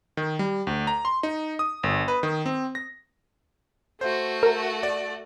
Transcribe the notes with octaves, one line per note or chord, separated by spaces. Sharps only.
D#3
G3
D2
A#5
C6
D#4
D#6
G1
B4
D#3
C4
A#6
A3 F#4 C5
A#4
D5